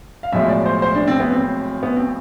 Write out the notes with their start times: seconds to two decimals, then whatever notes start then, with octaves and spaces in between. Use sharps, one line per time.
0.23 F5
0.32 B1 A2 F3 G#3 E5
0.49 D5
0.66 C5
0.82 C5
0.95 D4
1.07 C4
1.20 B3
1.32 C4
1.83 B3
1.96 C4